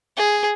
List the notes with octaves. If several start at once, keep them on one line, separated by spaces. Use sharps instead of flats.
G#4